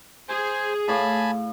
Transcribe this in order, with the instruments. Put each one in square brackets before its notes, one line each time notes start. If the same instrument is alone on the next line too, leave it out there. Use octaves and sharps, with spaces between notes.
[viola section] G#4 [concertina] C5 G#5
[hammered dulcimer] A2 F5 D6 [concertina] G#5 A5 B5